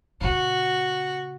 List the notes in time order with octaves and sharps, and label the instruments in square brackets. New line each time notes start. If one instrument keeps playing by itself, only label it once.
[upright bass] A#2 C#3 [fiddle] F#4